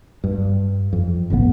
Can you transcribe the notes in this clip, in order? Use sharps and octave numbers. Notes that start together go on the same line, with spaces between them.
G2
F2
G1 C#2 A2 B3